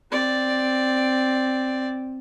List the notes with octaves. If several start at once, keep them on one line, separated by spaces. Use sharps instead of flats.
C4 D5